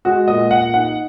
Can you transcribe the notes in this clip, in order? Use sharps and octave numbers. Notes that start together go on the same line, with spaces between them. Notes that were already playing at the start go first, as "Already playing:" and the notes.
G#3 F#4
A#2 D#5
A#2 F#5
D#4 F#5